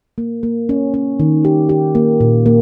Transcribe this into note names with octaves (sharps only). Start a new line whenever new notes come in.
A#3
A#3
C#4
C#4
D#3
G4
G4
A#3
A#2
A#3